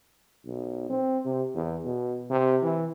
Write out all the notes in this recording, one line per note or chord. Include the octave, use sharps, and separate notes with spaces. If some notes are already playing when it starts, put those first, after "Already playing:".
B1
C4
C3
E2
B2
C3
E3